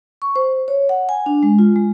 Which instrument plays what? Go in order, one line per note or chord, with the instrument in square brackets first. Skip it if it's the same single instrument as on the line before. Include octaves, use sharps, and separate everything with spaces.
[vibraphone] C#6
C5
C#5
F#5
G#5
D4
G#3
F4
G#3